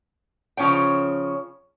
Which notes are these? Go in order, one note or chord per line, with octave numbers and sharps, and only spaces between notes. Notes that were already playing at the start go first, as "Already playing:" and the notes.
C#3 F3 C#4 C#5 G5